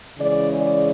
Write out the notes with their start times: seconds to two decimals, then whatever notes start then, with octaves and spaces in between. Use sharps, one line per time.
0.19 C#3 E3 G#3 D5
0.60 D5